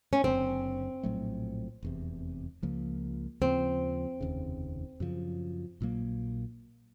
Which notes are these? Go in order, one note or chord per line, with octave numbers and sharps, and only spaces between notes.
C#4
F#1 F#2 D3 C4
A#1 A2 F#3 A3
F1 E2 C3
C#2 C#3 F3 A#3
D#2 C#3 F3 C4
F1 D#2 C#3
F#2 C#3 F3
A#1 A#2 F#3 A#3